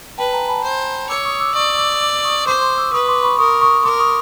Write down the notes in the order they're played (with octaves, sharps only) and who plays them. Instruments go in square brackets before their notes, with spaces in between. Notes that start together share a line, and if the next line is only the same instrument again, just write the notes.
[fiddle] B4 [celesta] G5 A5
[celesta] G#5 A#5
A5 B5
[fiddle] C5
[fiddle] C#5 [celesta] D6 E6
[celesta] C#6 D#6
D6 E6
[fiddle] D5 [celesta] C#6 D#6
[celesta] D6 E6
D6 E6
C#6 D#6
[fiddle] C5 [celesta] C6 D6
[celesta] C6 D6
D6 E6
[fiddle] B4 [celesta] C#6 D#6
[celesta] C6 D6
B5 C#6
[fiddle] A#4 [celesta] C#6 D#6
[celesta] C#6 D#6
[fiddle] A#4 [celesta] C6 D6
[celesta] C#6 D#6